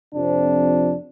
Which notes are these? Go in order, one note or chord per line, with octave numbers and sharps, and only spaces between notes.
F2 C3 F3 C4 D4